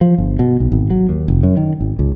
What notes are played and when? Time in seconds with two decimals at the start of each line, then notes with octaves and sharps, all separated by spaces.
0.01 F3
0.18 G1
0.39 B2
0.60 B1
0.72 G#1
0.90 F#3
1.09 D#2
1.28 F1
1.43 F#2
1.57 D#3
1.80 G#1
1.99 C#2